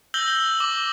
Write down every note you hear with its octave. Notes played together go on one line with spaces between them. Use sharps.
E6 G6 A#6 F#7 G7
D6